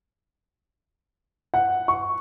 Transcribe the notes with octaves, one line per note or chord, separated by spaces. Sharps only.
F#5
C#6